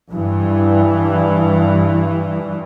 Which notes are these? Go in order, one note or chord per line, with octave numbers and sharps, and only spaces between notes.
G2 E3